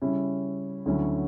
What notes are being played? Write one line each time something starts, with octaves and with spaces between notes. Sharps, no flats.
C#3 G3 C#4 E4
D2 D3 F#3 C#4 E4